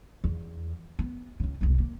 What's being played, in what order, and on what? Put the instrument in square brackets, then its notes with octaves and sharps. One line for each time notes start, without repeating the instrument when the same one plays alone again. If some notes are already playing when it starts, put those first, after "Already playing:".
[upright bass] E2
B3
C#2 C#3
E1 C2
A#3